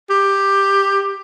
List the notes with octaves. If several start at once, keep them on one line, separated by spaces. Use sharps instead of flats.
G4